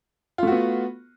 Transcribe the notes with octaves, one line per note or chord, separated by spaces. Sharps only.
A3 B3 F4 F#4